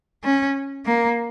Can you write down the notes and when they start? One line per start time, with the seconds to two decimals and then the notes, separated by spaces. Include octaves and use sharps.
0.24 C#4
0.85 A#3